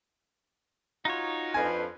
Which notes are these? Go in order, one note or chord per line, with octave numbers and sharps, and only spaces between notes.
D#4 F4 F#4 C#5
F2 D4 B4 G#5 C6